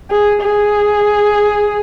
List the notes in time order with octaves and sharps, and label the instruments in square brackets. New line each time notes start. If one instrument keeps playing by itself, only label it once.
[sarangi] G#4
G#4